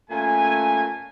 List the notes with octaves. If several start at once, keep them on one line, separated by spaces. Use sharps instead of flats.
A#2 A3 C#4 G#5